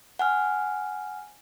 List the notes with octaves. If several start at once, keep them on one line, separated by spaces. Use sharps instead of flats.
F#5 G#5 F6